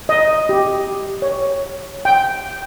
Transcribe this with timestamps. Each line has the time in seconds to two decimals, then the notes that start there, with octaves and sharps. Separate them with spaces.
0.09 D#5
0.49 G4
1.22 C#5
2.05 G5